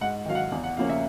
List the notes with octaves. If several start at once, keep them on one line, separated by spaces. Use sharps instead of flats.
G#2 F#5
D#3 F#3 F5
F#5
E2
F#5
C#3 F3 A#3 C#4 F5
E5